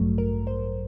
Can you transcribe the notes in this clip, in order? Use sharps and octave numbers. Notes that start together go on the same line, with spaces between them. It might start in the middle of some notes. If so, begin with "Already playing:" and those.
Already playing: A1 G2 F#3 A3
A#4
C5